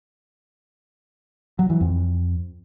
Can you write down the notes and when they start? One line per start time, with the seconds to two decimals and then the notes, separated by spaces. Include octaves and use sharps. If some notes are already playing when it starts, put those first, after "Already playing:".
1.59 F#3
1.70 E3
1.81 F2